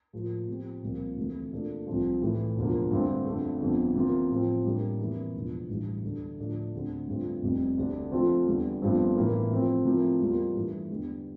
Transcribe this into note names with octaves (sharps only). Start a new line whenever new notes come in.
A2 F3 A#3
C3 F3 C4 G4
C2 A#2 F3 A#3
D2 C3 E3 A3
A#2 A3 D4 A4
C2 C3 F3
A2 E3 A3
E1 D2 D3 F3 A#3
G2 D3 A3 C4
F2 D3 A3
G1 F2 D3 F3
C3 E3 A#3 F4
A2 F3 C4
A2 G3 A#3 D4
F2 E3 A#3 E4
E1 E2 D3 F3
A1 G2 E3 G3
D2 D3 A3 D4 A4
A2 F3 A3 D4 A4
D2 D3 A3 C4
G2 D3 A3 C4 F4
F1 F2 C3 G3
D2 D3 A3 D4 G4
C3 F3 A3 C4 F4
E2 D3 G3
G1 G2 F3 A3 C4
A2 E3 A#3 E4 A#4
C3 F3 A3 C4
C3 F3 A3 E4 A#4
E2 C3 G3 A#3 F4
G2 E3 A3
E2 D3 G3